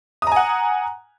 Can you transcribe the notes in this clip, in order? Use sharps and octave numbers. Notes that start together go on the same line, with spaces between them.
F#5 G#5 A#5 D#6